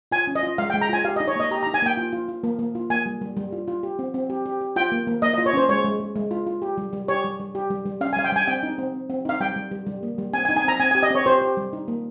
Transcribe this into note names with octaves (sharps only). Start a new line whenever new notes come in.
F4 G#5
C#4
D#5
F4
G#3 F5
G5
G#3
A#5
F4 G#5
G4 F5
D#5
D#4
C#5
A#3 D#5
G4 A#5
A#5
D#4
G#5
A#3 G5
F4
F4
F4
A#3
A#3
F4
A#3 G#5
G3
G3
G3
F4
F4
G4
C4
C4
G4
G4
G4
F4 G5
A#3
A#3
A#3 D#5
D#5
F4
C#5
C#4 C5
G#3 C#5
G#3
G#3
G#3
F4
F4
G4
G3
G3
G4 C#5
G3
G3
G4
G3
G3
C#4 F5
G#5
G3 F5
G5
G3 G#5
C4 G5
D#4
C4
C4
C4
D#4 F5
G3 G5
G3
G3
G3
A#3
G3
C4 G#5
G#5
D#4
G#5
C4 A#5
C4 G#5
G#5
G4
D#5
C4 C#5
G4 C5
G4
G3
D#4
A#3